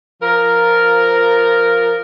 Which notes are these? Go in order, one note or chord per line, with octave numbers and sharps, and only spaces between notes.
F3 A#4